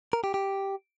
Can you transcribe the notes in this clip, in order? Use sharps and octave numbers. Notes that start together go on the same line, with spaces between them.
A#4
G4
G4